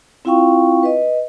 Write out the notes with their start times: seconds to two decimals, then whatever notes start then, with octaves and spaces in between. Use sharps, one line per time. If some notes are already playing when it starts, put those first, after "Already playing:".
0.25 C4 E4 F4 F5 G5 C#6
0.83 B4 D#5